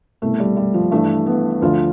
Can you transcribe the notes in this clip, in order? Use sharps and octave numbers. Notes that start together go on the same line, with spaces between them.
C2 B2 A3
G3
G3
F3
G2 E3 A3
B3
D2 D3 F3 F4